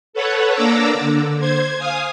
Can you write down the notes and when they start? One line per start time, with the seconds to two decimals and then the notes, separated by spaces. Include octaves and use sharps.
0.13 A4 B4 C#5 F#5
0.54 A#3 D4 A#5 D6 E6
0.94 D3
1.39 C5 G#6
1.77 F5 G#5 D#6